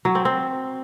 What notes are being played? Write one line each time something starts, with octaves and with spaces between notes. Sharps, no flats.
F#3
C4
C4